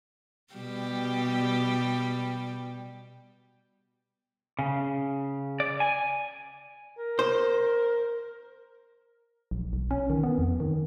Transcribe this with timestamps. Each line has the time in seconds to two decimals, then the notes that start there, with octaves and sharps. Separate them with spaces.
0.54 B2 G3 G4
4.59 C#3
5.60 D5
5.80 G#5
6.98 A#4
7.19 C5
9.51 A#1
9.73 B1
9.91 C#4
10.10 D#3
10.23 B3
10.38 F2
10.60 D#3